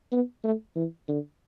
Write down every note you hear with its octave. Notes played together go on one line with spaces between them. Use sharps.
B3
A3
E3
D3